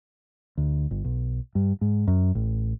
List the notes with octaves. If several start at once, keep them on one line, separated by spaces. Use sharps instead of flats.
D2
G1
B1
G2
G#2
F#2
A1